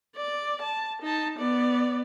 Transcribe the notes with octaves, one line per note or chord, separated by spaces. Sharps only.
D5
A5
D#4 A5
B3 D5